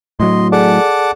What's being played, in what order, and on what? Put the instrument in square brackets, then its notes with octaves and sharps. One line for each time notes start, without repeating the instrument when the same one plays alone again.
[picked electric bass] A2 F#3 [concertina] D#5 C6
[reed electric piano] G#4 A4 D5 [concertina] F#5 A5 D6